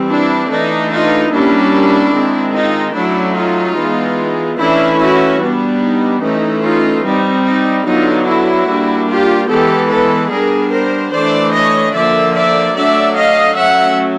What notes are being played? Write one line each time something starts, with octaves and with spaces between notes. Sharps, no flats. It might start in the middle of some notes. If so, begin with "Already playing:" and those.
Already playing: E3 G3 C4
D4 E4
E3 A3 D4 D#4
D#4 F4
G3 A#3 C#4 D4 E4
D#3 G#3 C4
D#4 F4
F#3 A3 C#4 D4 E4
D#4 F4
E3 G#3 B3
E3 A3 C#4 D4 E4
E4 F#4
G3 B3 D4
D#4
E3 A3 C#4 D#4
D#4 F4
G3 C4 D#4
D#4
D3 F#3 B3 D4 D#4 F4
E4 F#4
G3 A#3 D4
F4 G4
E3 G#3 B3 G4 A4
A4 B4
G3 B3 D4 G#4 A#4
A#4 C5
E3 A3 D4 C5 D5
C#5 D#5
D3 F3 A#3 D5 E5
D5 E5
F#3 A3 D4 D5 E5
D#5 F5
F#3 A3 C#4 E5 F#5